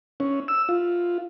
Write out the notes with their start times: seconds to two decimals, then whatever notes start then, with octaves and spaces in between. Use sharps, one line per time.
0.20 C#4
0.48 E6
0.69 F4